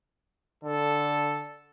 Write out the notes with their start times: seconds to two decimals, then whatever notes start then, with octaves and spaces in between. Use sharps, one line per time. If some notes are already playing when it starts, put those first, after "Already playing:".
0.64 D3 A4